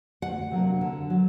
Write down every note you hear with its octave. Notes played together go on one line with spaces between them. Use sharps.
D2 F#5
C3 F#3 A#3 D4
D3
F#3